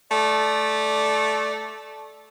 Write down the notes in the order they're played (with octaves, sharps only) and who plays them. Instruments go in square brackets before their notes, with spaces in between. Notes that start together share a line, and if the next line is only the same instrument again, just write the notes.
[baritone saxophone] A3 [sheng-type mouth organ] D5